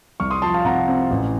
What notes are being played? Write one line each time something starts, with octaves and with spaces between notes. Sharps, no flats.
C2 C#6 F6
C6 D#6
F3 A5 C6
F5 A5
C3 F#5 A#5
C4
A1